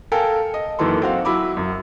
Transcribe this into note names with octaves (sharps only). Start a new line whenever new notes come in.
A4 A#4 F5 G5 G#5
D#5
F#2 D#3 E3 A#3 A4 C6
C4 F#4 F5
F#3 E4 B5 D6
F#2